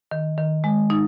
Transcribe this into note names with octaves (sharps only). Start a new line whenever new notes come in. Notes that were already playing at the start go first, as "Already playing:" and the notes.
D#3
D#3
G#3
D#4